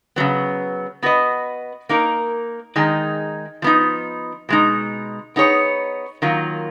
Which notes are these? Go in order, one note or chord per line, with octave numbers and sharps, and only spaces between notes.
C#3 F#3 B3
B3 F#4 B4 D#5
A#3 D#4 A#4
D#3 G#3 D#4 G#4
F3 B3 D#4
B2 G#3 D#4
B3 D#4 G#4 C#5
D#3 F#3 A#3 F4